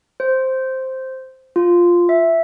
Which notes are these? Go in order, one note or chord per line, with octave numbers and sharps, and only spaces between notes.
C5
F4
E5